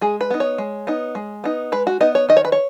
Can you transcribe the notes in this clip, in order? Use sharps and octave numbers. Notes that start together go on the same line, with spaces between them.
G#3 G#4
B4
B3 D#4
C#5
G#3
B3 D#4
G#3
B3 D#4
G#3 B4
F#4
B3 D#4 D#5
C#5
D#3 D#5
C#5
B4
C#5